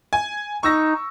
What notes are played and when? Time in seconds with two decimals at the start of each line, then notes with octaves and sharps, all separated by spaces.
0.13 G#5
0.63 D#4 C#6 E6 A#6